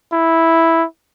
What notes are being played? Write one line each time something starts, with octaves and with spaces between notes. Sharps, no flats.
E4